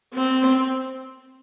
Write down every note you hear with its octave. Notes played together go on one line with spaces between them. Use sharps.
C4